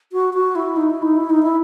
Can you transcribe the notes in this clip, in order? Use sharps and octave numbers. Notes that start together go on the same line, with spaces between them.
F#4
F#4
E4
D#4
E4
D#4
E4
D#4
E4